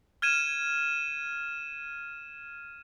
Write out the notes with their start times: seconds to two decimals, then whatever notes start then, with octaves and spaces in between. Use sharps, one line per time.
0.22 F6 G#6 D#7 E7